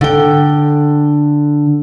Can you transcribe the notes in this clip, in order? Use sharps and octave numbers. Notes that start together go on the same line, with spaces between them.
D3 G5